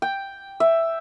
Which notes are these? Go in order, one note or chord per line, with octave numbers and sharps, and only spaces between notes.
G5
E5